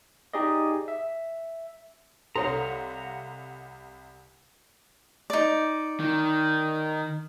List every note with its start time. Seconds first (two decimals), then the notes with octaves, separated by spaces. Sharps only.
0.33 D#4 G4 G#4 D5 D#5
0.88 E5
2.36 C2 A4 C#5 F5 F#5 A#5 C6
5.30 D#4 D5
6.00 D#3